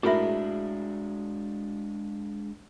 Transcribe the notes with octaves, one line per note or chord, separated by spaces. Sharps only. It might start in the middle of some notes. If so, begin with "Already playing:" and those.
A2 G#3 D4 F#4 G#4 A#4 E5 B5